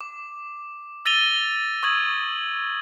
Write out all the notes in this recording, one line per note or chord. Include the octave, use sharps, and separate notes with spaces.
D6
E6 A6 A#6 D#7 F7 G7
C#6 D#6 E6 G#6 F#7 G7